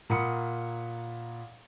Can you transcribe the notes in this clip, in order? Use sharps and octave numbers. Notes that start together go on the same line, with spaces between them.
A#2 A#4 F#5 B5 D#6 C#7